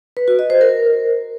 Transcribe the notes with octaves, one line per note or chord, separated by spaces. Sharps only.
B4
F#4
D#5
C5
A#4